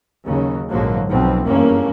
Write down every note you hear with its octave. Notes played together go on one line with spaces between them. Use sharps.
D#2 C#3 F#3
A#1 G#2 D3 F3 F#3 A#3
B1 F2 B2 F3 C4
F#1 E2 G2 A#3 C#4